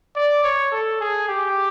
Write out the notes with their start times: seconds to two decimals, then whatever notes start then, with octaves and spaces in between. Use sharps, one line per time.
0.16 D5
0.44 C#5
0.72 A4
1.01 G#4
1.28 G4